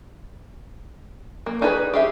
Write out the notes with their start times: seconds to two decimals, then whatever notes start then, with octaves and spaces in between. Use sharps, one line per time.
1.46 A#3
1.61 D4 D#4 G#4 A#4 B4
1.94 G4 G#4 E5